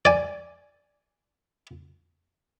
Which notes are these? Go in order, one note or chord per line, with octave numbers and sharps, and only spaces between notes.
D5 G#5